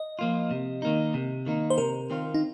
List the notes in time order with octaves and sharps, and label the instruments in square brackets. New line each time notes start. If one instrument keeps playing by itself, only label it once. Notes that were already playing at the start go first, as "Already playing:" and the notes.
Already playing: [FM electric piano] D#5
[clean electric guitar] F3 A#3 F4
C3
D#3 A#3 D#4
C3
D#3 A#3 D#4
[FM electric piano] C5
[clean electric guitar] C3 [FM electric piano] A#4
[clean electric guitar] D#3 C4 F4
[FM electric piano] D#4